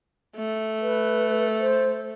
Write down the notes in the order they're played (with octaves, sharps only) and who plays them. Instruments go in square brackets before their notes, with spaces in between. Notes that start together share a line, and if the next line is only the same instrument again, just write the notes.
[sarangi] A3
[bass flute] B4
C5